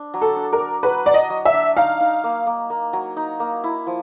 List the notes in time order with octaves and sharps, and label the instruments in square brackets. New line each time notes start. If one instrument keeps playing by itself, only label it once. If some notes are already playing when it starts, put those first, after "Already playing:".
Already playing: [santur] D4
F#3
[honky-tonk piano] A4
[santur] D4
[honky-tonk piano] A#4
[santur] D4
[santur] F#3 [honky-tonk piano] B4
[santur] F#3 [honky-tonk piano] D5
[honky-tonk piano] D#5
[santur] F#3
[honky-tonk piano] E5
[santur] D4
[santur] D#4 [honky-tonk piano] F5
[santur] D#4
A#3
A#3
A#3
F#3
D#4
A#3
E4
F3